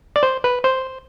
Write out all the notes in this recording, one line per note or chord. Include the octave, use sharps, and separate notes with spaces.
D5
C5
B4
C5